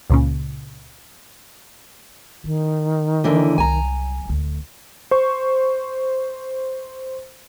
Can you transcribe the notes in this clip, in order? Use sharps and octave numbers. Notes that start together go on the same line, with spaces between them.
C#2 A#2 C#3
D#3 E4
D#2 D3 E3
C2 F#3 G#5 A#5
D1 D2
C5 C#6